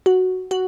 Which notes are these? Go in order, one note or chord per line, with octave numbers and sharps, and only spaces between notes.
F#4
F#4